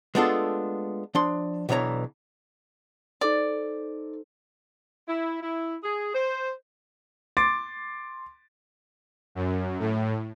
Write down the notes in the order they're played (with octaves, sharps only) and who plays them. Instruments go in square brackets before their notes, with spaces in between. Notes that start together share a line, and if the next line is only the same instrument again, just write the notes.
[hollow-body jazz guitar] G#3 A3 B3 D4 F4 A4
F3 D4 C6
B1 B2 E3 D4 C#5 A#5
[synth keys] D#4 A4 C5 [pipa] D5
[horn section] E4
E4
G#4
C5
[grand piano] C6 D6 A6 D7
[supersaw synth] F#2
A2